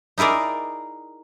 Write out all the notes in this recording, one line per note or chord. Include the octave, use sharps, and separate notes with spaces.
D#4 E4 G#4 A#4 D5